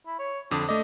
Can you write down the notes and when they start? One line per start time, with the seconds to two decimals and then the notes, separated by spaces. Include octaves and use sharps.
0.06 E4
0.19 C#5
0.51 F2 D3 D4 D#6
0.69 A3 D5 D#5